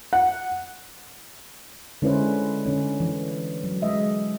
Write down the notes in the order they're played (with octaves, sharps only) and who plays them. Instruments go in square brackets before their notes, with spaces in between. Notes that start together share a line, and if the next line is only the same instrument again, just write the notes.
[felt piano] F#5
[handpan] D3 G#3 C#4 E4 B4 C5
D3 C#4
E3
F#3
G#3 D#5 E5